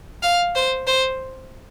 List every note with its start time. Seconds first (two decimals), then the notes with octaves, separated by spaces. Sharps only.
0.23 F5
0.55 C5
0.87 C5